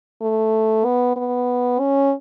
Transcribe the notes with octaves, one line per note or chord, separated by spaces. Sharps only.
A3
B3
B3
C#4